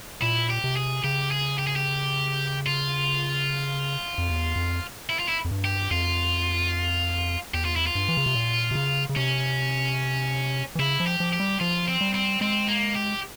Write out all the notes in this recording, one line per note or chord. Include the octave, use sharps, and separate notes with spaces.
A#2 E4
G4
C3
G#4
C#3 G4
G#4
G4
G#4
G4
F4
F2
E2
F2
E4
F4
E4
F2
G2
G4
F2 F4
E2 G4
F4
E4
F4
G2
E3
C#3
C3
A#2
C3
C#3
C#3
C3 C#4
E3
C#3 E4
F3
G4
F3
G4
G3
F3 F4
C4
G3
C4
G#3 C4
A#3
G4